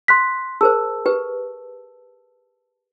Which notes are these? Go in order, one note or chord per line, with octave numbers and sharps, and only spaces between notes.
C6 F#6 B6
G#4 A#4 C5 A5 E6
G4 B4